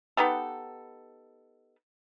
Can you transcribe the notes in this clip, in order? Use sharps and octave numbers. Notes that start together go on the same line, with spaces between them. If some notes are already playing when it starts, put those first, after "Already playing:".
B3 D#4 G4 A4